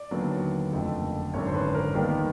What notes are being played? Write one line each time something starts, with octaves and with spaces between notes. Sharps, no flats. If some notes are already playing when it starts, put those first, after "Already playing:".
Already playing: D5
D#2 D3 F#3 B3
F#1 F2 D3 F3 A3
G#1 F#2 D3 C#5
C5
B4
A#4
D#2 D#3 G3 B3 A#4